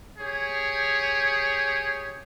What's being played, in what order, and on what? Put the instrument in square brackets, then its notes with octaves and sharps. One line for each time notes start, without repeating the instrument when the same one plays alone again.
[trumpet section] G4 G#4 C#5